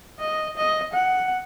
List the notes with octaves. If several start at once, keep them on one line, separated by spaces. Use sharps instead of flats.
D#5
D#5
F#5